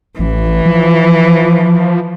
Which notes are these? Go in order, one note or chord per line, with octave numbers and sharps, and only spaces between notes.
A1 E3
F3